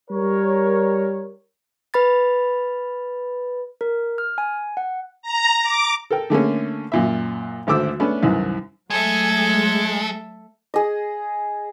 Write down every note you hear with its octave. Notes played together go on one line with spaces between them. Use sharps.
G3 A#4 C#5
B4 B5 A6
A#4
F6
G#5
F#5
A#5
D6
A4 A#4 G5
D3 A3 A#3 C#4
F#2 A#2 E5
G#1 D2 A3 C5 D6 E6
A3 B3 C#4 D4
C2 F#2 D#3 E3
F#3 G#3 A3 A4 E5 G#6
G#4 D#5